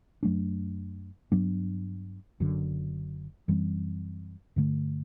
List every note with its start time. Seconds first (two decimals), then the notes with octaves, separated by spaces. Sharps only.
0.23 F#2 F#3 A3 D4
1.32 G2 F#3 B3 D4
2.40 F#1 F#2 D3
3.48 F#2 E3 G3 C4
4.56 G2 D3 A3